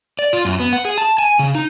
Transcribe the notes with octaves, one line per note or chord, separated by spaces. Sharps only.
D5
F4
F#2
B3
F#5
G#4
A5
G#5
C#3
D#4